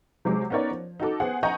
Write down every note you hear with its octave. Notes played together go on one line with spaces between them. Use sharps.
C3 F#3 G#3 D6
B3 C#4 D#4 A#4 C#5 D5
F3
D#4 F#4 A4 D6
B3 G#4 C5 F#5
D#5 F#5 G#5 A#5 C#6 G6